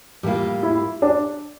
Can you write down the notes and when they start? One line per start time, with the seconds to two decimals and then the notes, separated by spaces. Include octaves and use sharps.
0.23 A2 G3 A#3 F4 G4
0.63 E4
1.02 D4